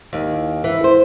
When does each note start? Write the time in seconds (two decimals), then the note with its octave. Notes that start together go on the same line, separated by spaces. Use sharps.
0.13 D#2
0.64 E3
0.84 C5